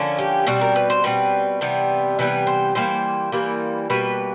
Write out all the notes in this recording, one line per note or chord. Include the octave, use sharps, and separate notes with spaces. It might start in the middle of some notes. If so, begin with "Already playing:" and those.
Already playing: D3 F3 A#3 C#4
G4
B2 G3 C4 F#4
A#4
B4
C5
B2 G3 C4 B4
C3 E3 G3 B3
C3 E3 G3 B3 B4
C5
E3 G3 A#3 C5
E3 G3 A#3
B2 G3 A#3 B4